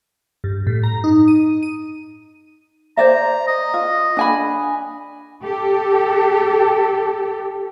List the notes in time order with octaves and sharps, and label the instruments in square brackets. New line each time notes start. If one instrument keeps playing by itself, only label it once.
[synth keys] G2
A2
A#5
D#4
D#7
D#7
[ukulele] C5 D5 E5 [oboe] A#5
[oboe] D#5
[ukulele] F4
D4 G#5 B5
[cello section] G4 A4